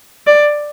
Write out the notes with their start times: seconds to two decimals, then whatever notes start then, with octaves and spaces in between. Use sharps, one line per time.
0.27 D5